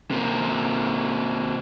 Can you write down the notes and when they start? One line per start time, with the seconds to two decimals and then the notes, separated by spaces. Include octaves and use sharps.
0.11 C3 A#3